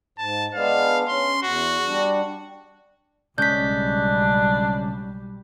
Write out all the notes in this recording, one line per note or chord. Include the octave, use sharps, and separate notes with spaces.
G#2 A5
G#3 B3 D4 F5
C#4 C6
E2 F#4
G3 D4
B1 C#3 G3 G#3 C#4 D4 G6 B6